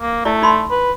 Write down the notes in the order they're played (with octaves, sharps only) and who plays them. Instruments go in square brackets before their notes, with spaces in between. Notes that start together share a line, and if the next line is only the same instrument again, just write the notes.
[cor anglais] A#3
[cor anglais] A3 [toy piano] E4 D5
[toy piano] D#4 B5 C6
[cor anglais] B4